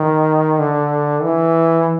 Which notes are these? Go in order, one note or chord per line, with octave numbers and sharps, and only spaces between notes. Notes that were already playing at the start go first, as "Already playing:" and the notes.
Already playing: D#3
D3
E3